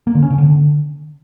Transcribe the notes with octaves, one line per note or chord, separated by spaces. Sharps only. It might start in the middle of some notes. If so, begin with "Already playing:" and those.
A#3
D3
C#4
C#3
D3